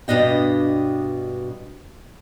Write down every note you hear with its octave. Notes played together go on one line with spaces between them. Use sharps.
G2 B2 D4 D#5 G5